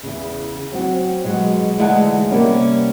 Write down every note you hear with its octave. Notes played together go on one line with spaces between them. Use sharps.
E2 C#3
F#3 C4 F#4
B2 F#3 G#3 F#4
D2 E3 G#3 D#4 F#5 A5
C3 G3 A#3 B3 C#4